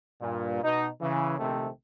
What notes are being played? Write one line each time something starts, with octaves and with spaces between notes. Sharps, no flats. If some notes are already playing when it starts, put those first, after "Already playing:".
G2 A#2
B2 D#4
C#3 E3
A#1 C3 D#3 A3 C4